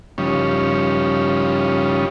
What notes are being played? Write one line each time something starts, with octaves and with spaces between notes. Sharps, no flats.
G2 C#3 F3 G3 C#4 D#4